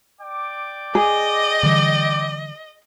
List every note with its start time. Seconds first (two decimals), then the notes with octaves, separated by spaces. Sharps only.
0.21 D5 G5 D6
0.95 G#4 D#5
1.63 D3 E3 G3